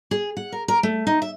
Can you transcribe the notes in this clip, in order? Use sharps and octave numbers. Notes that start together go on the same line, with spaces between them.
G#4
F#5
A#4
A#4
A3
D#4
E5